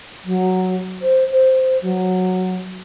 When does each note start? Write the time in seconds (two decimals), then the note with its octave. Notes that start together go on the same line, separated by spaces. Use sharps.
0.25 F#3
1.01 C5
1.31 C5
1.82 F#3